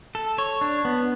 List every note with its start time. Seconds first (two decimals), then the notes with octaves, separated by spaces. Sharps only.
0.15 A4
0.38 C#5
0.61 D4
0.85 B3